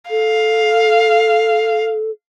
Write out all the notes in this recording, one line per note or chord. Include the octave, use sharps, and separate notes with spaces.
A4 F5